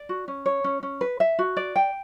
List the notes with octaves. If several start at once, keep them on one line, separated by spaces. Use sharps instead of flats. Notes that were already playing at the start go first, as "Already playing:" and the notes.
Already playing: D5
F#4
C#4
C#5
C#4
C#4
B4
E5
F#4
D5
G5